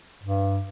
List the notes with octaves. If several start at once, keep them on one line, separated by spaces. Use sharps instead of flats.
G2